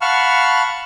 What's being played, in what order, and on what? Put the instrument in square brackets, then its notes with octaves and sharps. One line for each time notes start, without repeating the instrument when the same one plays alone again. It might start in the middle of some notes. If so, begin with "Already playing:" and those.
[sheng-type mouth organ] F5 F#5 A5 B5 C#6 F6